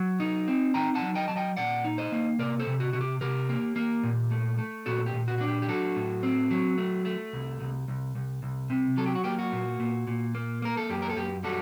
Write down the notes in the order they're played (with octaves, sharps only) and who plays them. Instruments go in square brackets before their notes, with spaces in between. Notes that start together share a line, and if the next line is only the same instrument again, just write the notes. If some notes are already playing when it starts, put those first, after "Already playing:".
Already playing: [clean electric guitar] F#3
D#4
C4
D#4 G5 A#5
F#5 A5
F#3
D#5 G5
F#3 A5
D#5 G5
A#2 D5 F#5
D#4
C5 D#5
A#3
C3 A#4 D5
A4 C5
C3
F#4
C3 F#4
G4
C3 G4 A#4
A#3
A#3
A#2
A3
A3
A#2 F#4 A4
G4
A#2
F#4
D4 F#4
G4
G4
F#3 F#4 A4
A2
C4
F#3
A3
A3
C2
C2
C2
C2
C2
C3
F#3 A4
G4
F#4
A#3 G4
F#4
A#2
A#2
A#2
A#3
A#3 A#4
A4
F#2 G4
A#4
A4
F#2 G4
G3 F#4 A4